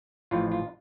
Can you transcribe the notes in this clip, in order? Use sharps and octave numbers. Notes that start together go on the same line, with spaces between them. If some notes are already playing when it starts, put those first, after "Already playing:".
A1 A2 F3 F4
F4